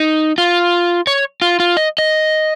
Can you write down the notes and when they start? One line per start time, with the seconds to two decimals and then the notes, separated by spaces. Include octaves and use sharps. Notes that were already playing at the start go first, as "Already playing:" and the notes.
Already playing: D#4
0.38 F4
1.07 C#5
1.42 F4
1.60 F4
1.77 D#5
1.98 D#5